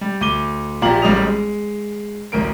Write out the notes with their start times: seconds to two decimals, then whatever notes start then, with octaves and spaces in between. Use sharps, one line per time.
0.01 G3
0.21 D2 D6 D#7 G7
0.82 A#1 A#2 G4 F5 A#5 F#7
1.02 E1 A1 G3 D#5 D#6 F7
1.23 G#3
2.32 A1 D2 A#4 D7